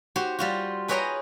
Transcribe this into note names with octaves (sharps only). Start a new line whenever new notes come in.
F#4 G4 C5
G3 F4 F#4
G#4 B4 C#5 D#5 G5 A#5